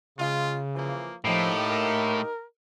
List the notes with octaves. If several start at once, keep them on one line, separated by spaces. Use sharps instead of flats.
C#3 G#3 F4
E3 F3 A#3
A2 F3 A#3 D#4 G4
A#4